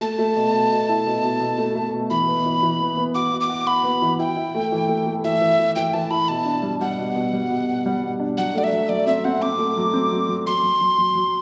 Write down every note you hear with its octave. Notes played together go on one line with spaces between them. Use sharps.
A3 A5
A3
B2
B2
B2
E4
B2
B2
B2
A3
A3
B2
E3 B5
B3
E3
E3
B3
B3
F#4 D6
F#4
D6
F#4
F#4 B5
B3
E3
E4 G5
E4
A3
E3
A3
A3
E3 E5
E3
E4
E3 G5
E3 A5
E4 B5
B2 A5
D4
G3
G3 F#5
B2
B2
G3
B2
B2
G3
B2
D4
F#3 F#5
A3 D5
E5
F#3
F#3 D5
C4 E5
C4 F#5
C4 D6
A3
F#3
C4
F#3
F#3
F#3 C6
F#3
F#3
F#3
F#3